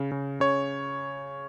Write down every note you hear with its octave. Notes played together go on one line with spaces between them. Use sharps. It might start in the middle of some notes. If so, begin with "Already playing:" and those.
Already playing: C#3
C#3
C#3 C#5